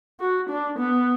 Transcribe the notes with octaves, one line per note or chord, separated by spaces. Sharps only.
F#4
D4
B3